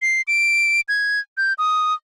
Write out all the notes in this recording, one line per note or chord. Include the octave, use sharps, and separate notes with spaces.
C7
D7
G#6
G6
D#6